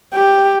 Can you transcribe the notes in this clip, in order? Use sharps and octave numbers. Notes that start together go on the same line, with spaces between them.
G4